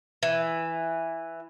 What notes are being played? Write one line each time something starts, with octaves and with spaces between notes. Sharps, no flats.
E3